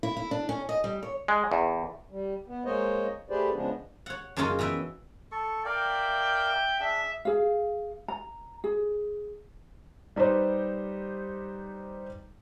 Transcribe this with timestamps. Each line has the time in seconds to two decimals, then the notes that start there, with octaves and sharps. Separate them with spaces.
0.03 E4
0.17 E4
0.31 D4
0.49 C#4
0.69 D#5
0.84 G3
1.03 C#5
1.28 G#3
1.51 E2
2.11 G3
2.48 B3
2.65 G#3 A#3 C5 C#5 D#5
3.30 A3 G4 G#4 B4 C5 D5
3.53 C#3 F3 G#3 B3 D4
4.06 C#5 F#5
4.36 F#2 C#3 A#3 C#4 D#4 F4
4.59 E3 B3 E4 E5 G5
5.32 A4 C#6
5.65 A#4 D5 E5 F5 G5
6.80 D4 G#4 E5
7.25 G#4 F5
8.08 A#5
8.64 G#4
10.16 G3 D#4 G4 B4 C5